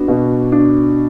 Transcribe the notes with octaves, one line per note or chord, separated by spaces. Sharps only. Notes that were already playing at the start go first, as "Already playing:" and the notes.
Already playing: B3 D4 F#4
B2
D4